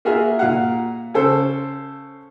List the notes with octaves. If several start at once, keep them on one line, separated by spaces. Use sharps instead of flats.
A#3 F4 F#4 G#4 A#4 E5
A#2 F5 F#5
C#3 A4 C5